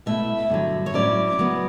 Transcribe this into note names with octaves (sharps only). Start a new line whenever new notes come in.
B2 A3 E4 E5
G2 D3 F#3
C#5
A2 F#3 C#4 E4 D5
C#3 F#3 B3